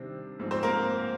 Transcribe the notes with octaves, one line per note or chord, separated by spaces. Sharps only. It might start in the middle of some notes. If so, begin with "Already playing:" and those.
Already playing: C3 D#3 G3 C4 D4
G#2 F3 C4
C4 C5
A#3 A#4